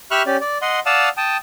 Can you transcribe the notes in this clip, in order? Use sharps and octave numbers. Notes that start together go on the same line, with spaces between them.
G4 E5 B5 C#6 F6 F#6
C#4 G4 D5
D5
D#5 F#5 C6
D5 F5 F#5 A5 D#6 E6
G5 A5 D#6